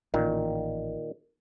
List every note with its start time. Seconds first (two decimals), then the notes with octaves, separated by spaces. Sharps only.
0.14 A1 A#2 D#3